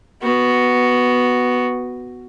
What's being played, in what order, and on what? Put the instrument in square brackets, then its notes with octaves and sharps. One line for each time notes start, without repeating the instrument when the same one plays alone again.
[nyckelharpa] B3 F#4